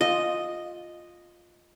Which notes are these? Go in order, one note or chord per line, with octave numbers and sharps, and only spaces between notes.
F4 D#5